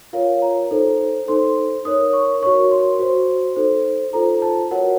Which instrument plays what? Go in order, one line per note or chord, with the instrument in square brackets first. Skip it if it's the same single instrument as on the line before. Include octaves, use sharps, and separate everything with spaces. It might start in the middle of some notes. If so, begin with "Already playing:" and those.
[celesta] F4 A#4 C#5 F5
A#5
D#4 A4 C5
D#4 A4 C5 C6
D#4 A#4 C#5 D#6
C#6
F#4 A#4 C#5 C#6
C6
F#4 C5
D#4 A4 C5
F4 A4 C5 A#5
A5
F#4 A#4 C#5 F#5